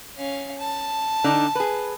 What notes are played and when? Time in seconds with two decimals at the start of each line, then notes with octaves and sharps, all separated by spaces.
0.18 C#4 F5
0.59 A5
1.24 D3 D4 D#4
1.55 G#4 B4